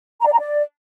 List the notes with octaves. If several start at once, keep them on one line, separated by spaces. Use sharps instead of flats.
A#5
D5
A#5
D5